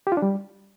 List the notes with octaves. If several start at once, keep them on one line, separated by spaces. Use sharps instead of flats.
G4
F4
D4
G3